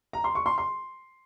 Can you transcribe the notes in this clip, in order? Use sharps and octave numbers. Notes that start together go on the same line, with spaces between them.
A#5
C6
C#6
C6
C6